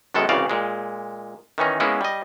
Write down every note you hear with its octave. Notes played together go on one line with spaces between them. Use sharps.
F#2 D#3 G#3 B3 A4
C2 C#3 E3 F#4 D5 F5
A#2 G#3
D#3 E3 C#4 D#4
G#3 A#3 B3 C#4 E4
G3 D#5